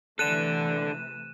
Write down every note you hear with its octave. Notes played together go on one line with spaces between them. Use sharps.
C3 E3 A3 D4 A4 F#6 D#7 E7